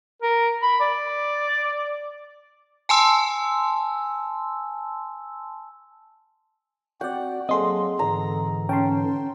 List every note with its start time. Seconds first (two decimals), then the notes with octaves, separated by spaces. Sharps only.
0.22 A#4
0.63 B5
0.80 D5
2.89 G#5 A5 C6 E6
7.01 C4 F#4 D5 F#5 G5
7.49 F#3 A#3 C4 G#4 A4 D#5 C6
7.99 G#2 D3 E3 A#5
8.69 C#4 G5 A5 C6